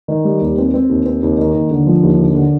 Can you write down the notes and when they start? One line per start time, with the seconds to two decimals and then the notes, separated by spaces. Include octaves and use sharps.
0.08 D#3
0.25 G3
0.41 D#2
0.58 C4
0.74 C4
0.89 D#2
1.06 C4
1.23 D#2
1.38 D#3
1.54 D#2
1.71 D3
1.86 F3
2.03 D#2
2.19 D3
2.35 D3